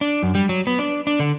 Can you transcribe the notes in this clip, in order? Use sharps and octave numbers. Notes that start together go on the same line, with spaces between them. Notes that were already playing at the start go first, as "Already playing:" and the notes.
D4
F#2
G3
F#3
B3
D4
D4
D3